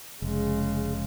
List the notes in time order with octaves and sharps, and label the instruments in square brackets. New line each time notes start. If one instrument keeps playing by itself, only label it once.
[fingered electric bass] F1 [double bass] C#3 G#3